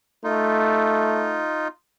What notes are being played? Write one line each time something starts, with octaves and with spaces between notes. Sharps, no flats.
A3 D#4 F4